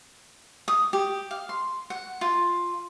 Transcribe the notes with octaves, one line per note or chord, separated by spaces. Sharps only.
D#6
G4
F5
C6
F#5
F4